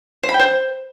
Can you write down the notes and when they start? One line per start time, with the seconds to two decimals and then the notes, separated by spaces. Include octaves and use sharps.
0.23 C5
0.29 B5
0.34 G5
0.40 C5